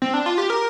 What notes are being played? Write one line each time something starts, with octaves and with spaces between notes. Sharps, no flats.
C4
D4
F4
G4
A#4